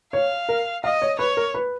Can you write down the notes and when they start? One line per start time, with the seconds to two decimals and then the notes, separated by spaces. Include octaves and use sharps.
0.13 C#5 F5
0.49 A#4
0.84 D#5 F5
1.02 C#5
1.19 B4 C#5
1.37 A#4
1.54 B4